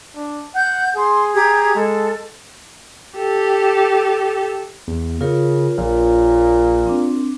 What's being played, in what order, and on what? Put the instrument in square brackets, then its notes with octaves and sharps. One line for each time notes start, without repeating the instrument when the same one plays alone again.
[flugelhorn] D4
[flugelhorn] F#5 [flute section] G6
[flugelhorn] G#4 [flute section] C6
[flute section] G4 A#5 G#6
[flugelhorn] G#3 [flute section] A4
[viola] G4 A4
[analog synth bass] E2
[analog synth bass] C#3 [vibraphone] F4 A#4 C#5
[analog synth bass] A#1 [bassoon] A#2
[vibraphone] C4 D4